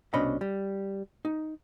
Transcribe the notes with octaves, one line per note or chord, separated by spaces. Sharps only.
C2 B2 C#4 D4 D#5 B5
G3
D#4